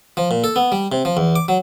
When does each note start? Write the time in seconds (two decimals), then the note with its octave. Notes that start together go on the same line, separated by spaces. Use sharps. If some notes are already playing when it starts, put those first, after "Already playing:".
0.17 F3
0.31 A#2
0.44 A4
0.56 B3
0.72 G3
0.92 C3
1.05 F3
1.17 E2
1.36 D6
1.48 F#3